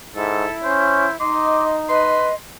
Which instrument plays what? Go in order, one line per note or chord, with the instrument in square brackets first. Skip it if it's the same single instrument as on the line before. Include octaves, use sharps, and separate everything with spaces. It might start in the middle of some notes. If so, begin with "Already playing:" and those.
[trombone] G#2 [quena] E4 [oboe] A4
[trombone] C#4 [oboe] C5
[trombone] D#4 [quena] D#5 [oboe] C6 [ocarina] D6
[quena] B4 [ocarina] D#5 [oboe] C6